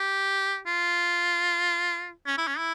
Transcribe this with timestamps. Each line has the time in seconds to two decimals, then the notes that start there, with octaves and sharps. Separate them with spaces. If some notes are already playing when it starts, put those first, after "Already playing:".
Already playing: G4
0.66 F4
2.27 C#4
2.38 E4
2.48 C#4
2.58 E4